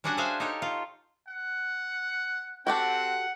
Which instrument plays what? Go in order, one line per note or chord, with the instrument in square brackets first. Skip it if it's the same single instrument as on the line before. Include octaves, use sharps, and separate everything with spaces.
[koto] G3 C#4 D4 F#4 F#5 G#5
F#4 G#4 C5 E5 F5 G#5
D#4 G4 A4 C#5 D#5
F4
[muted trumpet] F#5
[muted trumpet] C4 [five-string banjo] F#4 G4 A4 [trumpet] F#5